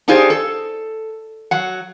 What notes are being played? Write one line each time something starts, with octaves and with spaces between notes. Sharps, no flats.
D4 D#4 F4 G4 G#4 C5
A4
F#3 F#5